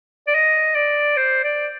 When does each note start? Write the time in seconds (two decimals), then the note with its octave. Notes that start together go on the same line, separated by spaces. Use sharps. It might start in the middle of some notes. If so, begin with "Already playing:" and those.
0.27 D5
0.35 D#5
0.76 D5
1.17 C5
1.44 D5